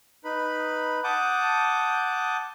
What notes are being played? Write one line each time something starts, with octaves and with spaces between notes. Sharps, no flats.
D#4 B4 B5
F#5 A5 D6 D#6 G6